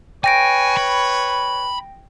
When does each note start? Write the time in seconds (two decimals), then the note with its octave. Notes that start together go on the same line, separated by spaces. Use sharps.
0.24 B4 C#5 G5 G#5 A#6 D7
0.77 B5